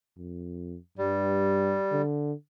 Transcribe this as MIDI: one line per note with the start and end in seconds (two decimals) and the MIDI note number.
0.17 0.76 41
0.98 1.76 43
0.98 2.02 55
1.92 2.33 50